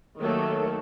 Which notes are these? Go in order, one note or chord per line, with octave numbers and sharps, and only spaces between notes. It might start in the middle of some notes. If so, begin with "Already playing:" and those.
D#3 F#3 A3 A#3 A4